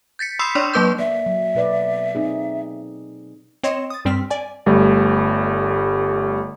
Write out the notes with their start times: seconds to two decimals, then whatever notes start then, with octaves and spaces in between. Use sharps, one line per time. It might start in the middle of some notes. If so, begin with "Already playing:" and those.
0.19 G6 A6 B6 C#7
0.39 B5 C6 D#6 E6 B6 C7
0.55 D4 C#5 D5 C6 C#6
0.74 F#3 A#3 B4 D6 G6
0.99 A#3 D5 E5
1.26 F#3
1.55 B2 B4 D5
2.15 C4 D#4 G#4
3.63 C4 C#5 D#5 C6 E7
3.90 D#6 A6
4.05 G2 G3 C4 F6 B6
4.30 D5 G#5
4.66 G1 G3 A3